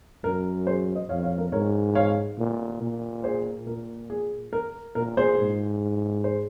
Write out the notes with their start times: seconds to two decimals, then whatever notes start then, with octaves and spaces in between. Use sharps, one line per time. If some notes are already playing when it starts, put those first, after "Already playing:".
0.24 F#2 A#4
0.67 G#4 C5
0.95 C5 D#5
1.09 F2 C#5 F5
1.23 C#5 F5
1.38 A#4
1.52 G#2 A#4 C#5
1.95 C#5 F5
2.38 A#2
2.82 A#2
3.24 G#4 C5
3.66 A#2 A#4
4.10 G#4
4.53 A#4
4.95 A#2 A#4
5.17 G#4 C5
5.39 G#2
6.24 G#4 C5